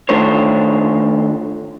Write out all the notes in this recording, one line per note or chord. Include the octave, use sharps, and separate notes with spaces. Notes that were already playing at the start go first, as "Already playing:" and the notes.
D#3 A3 D4 F4 C5 C#5